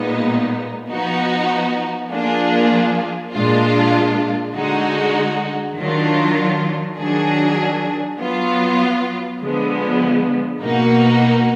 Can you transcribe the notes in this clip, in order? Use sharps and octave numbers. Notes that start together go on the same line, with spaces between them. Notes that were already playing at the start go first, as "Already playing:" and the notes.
Already playing: A#2 G#3 B3 D#4
F3 B3 D#4 F#4
F3 A#3 D4 F4 G#4
A#2 G#3 D4 F4
D3 G#3 D#4 F#4
D#3 F#3 D4 F4
D#3 F#3 D4 G#4
F#3 B3 F4
D3 F3 G#3 B3
B2 A#3 D#4 F#4